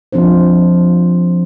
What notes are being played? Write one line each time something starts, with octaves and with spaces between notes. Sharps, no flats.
F3 C4 D4 C5